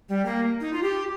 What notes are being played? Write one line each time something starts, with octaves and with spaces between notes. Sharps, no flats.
G3
A#3
D#4
F4
G4